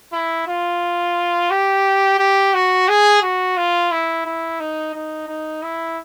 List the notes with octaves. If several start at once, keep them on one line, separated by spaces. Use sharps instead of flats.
E4
F4
G4
G4
F#4
G#4
F#4
F4
E4
E4
D#4
D#4
D#4
E4